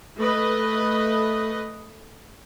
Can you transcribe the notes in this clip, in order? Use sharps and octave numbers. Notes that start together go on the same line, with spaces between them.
A3 B4 D#5